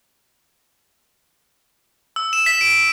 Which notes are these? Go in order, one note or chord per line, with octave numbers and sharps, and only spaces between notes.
E6
E7
B6
D7